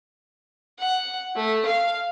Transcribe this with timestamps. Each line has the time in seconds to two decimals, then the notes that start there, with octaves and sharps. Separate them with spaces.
0.79 F#5
1.36 A3
1.66 F5